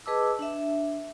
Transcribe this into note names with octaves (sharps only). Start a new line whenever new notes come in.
G#4 B4 D#5 A5 D6 E6
D4 E5